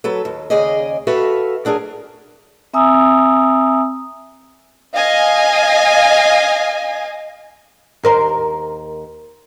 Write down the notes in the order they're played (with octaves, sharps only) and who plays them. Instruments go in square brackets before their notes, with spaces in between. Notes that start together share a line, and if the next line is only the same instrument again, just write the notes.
[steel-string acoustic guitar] F#3 A4 B4
D#2
D#2 C#3 G#4 D5 D#5
F#4 A4 B4 E5 F5
F#3 D4 G#4 A#4
[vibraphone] C4 E5 G#5 A#5 D#6 E6
[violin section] D#5 F5 G#5
[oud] D#2 A#4 C5